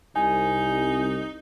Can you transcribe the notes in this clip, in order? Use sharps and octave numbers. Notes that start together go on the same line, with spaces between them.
C2 D#4 G#5